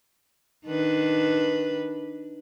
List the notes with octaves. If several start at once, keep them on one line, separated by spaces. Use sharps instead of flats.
D#3 D4 B4